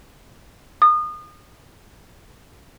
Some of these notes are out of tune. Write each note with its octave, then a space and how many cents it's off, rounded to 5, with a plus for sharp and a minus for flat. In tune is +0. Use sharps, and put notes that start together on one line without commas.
D#6 -30